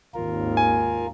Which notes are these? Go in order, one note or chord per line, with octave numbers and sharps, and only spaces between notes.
G#1 D#2 F4 A#4
G#5